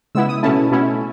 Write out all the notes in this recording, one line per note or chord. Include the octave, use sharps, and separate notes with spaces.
C#3 G#3 B3 E4 E6
D#6
B2 A3 C#4 E4 A5
B2 A3 C#4 E4